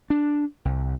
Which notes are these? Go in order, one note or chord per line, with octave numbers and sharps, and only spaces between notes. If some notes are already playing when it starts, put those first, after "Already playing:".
D4
C2